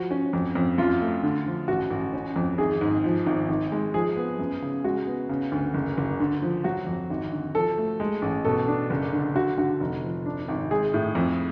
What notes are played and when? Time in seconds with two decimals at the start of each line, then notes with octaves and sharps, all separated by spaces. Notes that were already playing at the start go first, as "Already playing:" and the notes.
Already playing: F3 F#4
0.11 C#4
0.33 F2
0.55 F2
0.78 F#2 F4
1.01 A3
1.23 D3
1.46 F3
1.68 A1 F#4
1.90 A1
2.13 C#4
2.36 F2
2.58 G#1 G#4
2.81 G#2
3.04 F3
3.26 G#1
3.49 G#1
3.72 G#3
3.94 F3 G#4
4.16 B3
4.39 F#2
4.62 C#3
4.84 G#3 F#4
5.07 B3
5.29 C#3
5.52 D2
5.74 F#1
5.97 F#1
6.20 D3
6.42 F3
6.64 F#3 F#4
6.87 F2
7.10 G#1
7.32 D3
7.54 F3 A4
7.78 A3
8.00 G#3
8.22 A1
8.45 B2 A4
8.68 D4
8.90 F#1
9.13 D3
9.35 D3 F#4
9.58 D3 F#4
9.80 F1
10.03 F3
10.26 D4
10.48 G#1
10.71 G#3 G#4
10.94 A2
11.15 F2